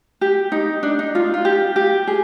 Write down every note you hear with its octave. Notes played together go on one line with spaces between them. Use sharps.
G4
D#4
D4
D#4
F4
F4
G4
G4
G#4